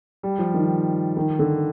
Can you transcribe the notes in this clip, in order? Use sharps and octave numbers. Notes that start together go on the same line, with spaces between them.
G3
F3
D#3
D#3
D3